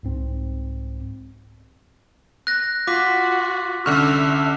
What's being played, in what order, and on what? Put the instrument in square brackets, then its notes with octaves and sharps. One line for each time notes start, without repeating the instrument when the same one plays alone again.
[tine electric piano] C2 G#2 C4
[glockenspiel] F#6 A#6
[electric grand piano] F4 [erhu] F#4 [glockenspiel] D6 B6
[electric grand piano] C2 D3 F6 [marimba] C#4 [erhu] E5